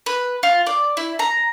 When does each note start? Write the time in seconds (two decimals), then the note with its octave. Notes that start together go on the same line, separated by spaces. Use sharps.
0.06 B4
0.43 F4
0.67 D5
0.97 E4
1.19 A#5